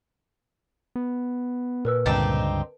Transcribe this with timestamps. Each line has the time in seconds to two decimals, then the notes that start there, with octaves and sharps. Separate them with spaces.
0.96 B3
1.85 A#2 A#4 B4 E6
2.06 C#2 G2 D3 C4 D#4 G4 A5 A6